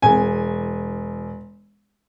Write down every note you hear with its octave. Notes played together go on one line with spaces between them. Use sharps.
E1 G#5